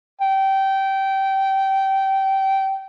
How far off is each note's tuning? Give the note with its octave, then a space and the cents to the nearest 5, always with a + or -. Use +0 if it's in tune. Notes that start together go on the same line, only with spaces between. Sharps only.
G5 -20